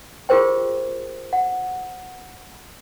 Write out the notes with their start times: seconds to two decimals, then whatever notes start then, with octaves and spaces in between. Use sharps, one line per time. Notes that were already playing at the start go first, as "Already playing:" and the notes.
0.29 F4 G4 G#4 A#4 C5 G5
1.33 F#5